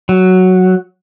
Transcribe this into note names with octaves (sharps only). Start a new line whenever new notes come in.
F#3